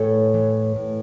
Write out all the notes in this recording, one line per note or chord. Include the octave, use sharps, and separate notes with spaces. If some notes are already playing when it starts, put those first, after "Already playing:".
Already playing: A2 E3 A4 C#5
E3
A2